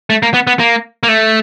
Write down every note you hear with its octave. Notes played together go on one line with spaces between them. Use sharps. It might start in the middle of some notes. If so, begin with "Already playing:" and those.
A3
A#3
B3
B3
A#3
A#3
A3